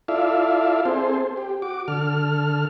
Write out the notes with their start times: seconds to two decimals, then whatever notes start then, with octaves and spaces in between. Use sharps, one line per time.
0.08 E4 F4 A4 D5 E5 F5
0.85 C4 G#4 A4 C5
1.37 G4
1.62 F#4 D6
1.88 D3 A4 F6